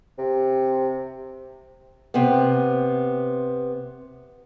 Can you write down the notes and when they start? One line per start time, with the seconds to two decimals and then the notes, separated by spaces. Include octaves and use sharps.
0.18 C3
2.14 C3 B3